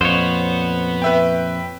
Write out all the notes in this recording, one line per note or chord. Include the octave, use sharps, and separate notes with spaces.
F2 A#2 B3 C5 C#5
B4 E5 G5